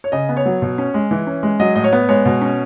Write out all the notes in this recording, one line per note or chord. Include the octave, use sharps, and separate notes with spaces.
C#5
C#3 D#5
B3
C#5
F#3
B2
C#4
G#3
E3
C#4
G#3
F#3 D#5
A2 D#5
C#5
B3
G#3 C#5
B2
C#4